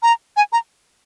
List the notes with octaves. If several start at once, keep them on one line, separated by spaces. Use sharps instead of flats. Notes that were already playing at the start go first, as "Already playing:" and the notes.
A#5
G#5
A#5